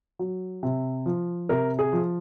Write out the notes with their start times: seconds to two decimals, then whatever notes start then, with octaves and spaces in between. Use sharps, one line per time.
0.19 F#3
0.63 C3
1.06 F3
1.49 C3 A#4
1.79 G#4
1.93 F3